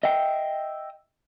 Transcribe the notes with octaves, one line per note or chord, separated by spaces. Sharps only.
D#5 E5 G5